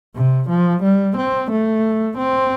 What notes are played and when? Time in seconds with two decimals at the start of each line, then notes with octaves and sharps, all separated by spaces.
0.15 C3
0.49 F3
0.83 G3
1.17 C4
1.51 A3
2.17 C4